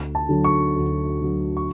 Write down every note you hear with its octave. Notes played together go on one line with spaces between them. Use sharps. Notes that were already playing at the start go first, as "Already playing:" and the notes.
Already playing: D2
A5
D3 F#3
C#6
D2
D3 F#3
C#6